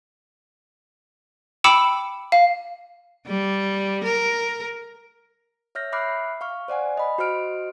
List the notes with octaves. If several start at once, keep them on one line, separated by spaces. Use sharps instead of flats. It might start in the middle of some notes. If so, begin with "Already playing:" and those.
G5 B5 D6 E6 C#7 E7
F5
G3
A#4
C#5 E5 F6 G6 A#6
E5 B5 D6 F6 F#6 C7
F5 C#6 F6
C5 D5 F#5 G#5
D#5 B5
F#4 C5 D#5 F6 D7